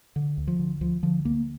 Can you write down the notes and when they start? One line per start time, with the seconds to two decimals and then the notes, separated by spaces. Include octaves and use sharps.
0.16 D3
0.37 D2
0.47 F3
0.59 D3
0.81 D2 F3
1.03 D3 F3
1.25 D2 A#3